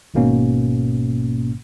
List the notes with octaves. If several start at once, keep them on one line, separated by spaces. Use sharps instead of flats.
G#1 G#2 B2 A#3 C#4